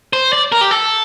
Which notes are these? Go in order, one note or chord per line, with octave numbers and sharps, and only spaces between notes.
C5
D5
A#4
G4
A4